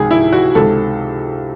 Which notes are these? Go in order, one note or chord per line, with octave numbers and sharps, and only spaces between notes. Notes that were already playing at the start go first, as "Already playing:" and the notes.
Already playing: C#2 C3 D#3 G#4
E4
F#4
C#2 C3 D#3 A4